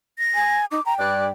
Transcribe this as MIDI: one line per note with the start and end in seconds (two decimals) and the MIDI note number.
0.18 0.59 94
0.35 0.65 80
0.71 0.80 63
0.71 0.84 86
0.86 1.31 79
0.86 0.94 82
0.99 1.28 43
0.99 1.28 74
0.99 1.25 90